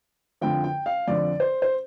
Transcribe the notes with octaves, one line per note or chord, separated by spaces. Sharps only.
F2 D3 F3 G5
G5
F5
F2 D3 F3 D5
C5
C5